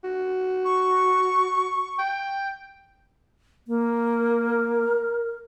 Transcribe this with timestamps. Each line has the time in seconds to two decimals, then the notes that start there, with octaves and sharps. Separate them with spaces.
0.04 F#4
0.65 C#6
1.99 G5
3.68 A#3
4.18 A#4